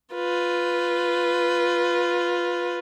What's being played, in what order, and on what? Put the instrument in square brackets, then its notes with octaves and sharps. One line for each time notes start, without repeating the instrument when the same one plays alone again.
[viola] F4 B4